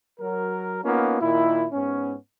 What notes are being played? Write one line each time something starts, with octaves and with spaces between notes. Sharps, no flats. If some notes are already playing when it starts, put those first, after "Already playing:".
F#3 A#4
A#3 B3 C#4 D#4 F4
A#2 D#3 E4
G#2 B3 C#4